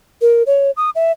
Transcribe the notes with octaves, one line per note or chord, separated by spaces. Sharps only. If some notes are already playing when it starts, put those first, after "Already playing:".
A#4
C#5
D#6
E5